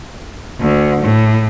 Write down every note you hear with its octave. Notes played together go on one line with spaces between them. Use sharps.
D2
A2